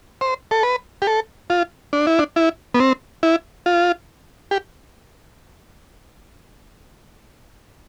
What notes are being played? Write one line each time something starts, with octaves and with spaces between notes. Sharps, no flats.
C5
A4
B4
G4
A4
F4
D4
E4
D4
E4
B3
C4
E4
F4
G4